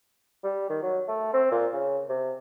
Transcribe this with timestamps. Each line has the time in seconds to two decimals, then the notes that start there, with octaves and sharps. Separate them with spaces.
0.44 G3
0.70 D#3
0.82 F#3
1.08 A3
1.33 C4
1.52 A#2
1.73 C#3
2.09 C3